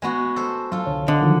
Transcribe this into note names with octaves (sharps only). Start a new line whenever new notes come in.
G#3 B3 F#4
A4 C5
F#3 F4 A4
C2 D3 C#5
D3 D#5
D#3 F3 F#3